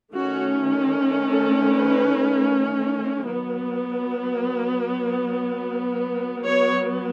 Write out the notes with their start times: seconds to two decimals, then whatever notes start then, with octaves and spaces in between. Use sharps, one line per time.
0.12 D#3 A3 C#4 F#4
1.31 A4
1.71 B4
3.29 F#3 B3
6.44 F#3 B3 C#5